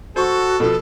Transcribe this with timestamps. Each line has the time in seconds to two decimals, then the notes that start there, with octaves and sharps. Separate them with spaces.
0.16 F#4 A4 C5 C#6
0.60 B2 F3 A4